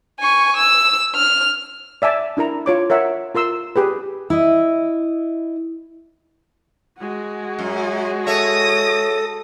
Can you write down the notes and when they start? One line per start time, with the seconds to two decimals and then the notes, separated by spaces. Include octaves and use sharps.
0.20 G#5 C#6
0.57 E6
1.16 F6
2.02 D5 E5 G#5 A5 D6
2.37 D4 E4 A#4 A#5
2.66 F4 C#5 D6
2.90 A#4 C#5 E5 F#5
3.35 F4 A#4 C6 E6
3.76 G4 G#4 B4
4.30 E4 D#5
6.98 G#3 F#4
7.59 F#2
8.27 A4 C#5 E5 D#6 A#6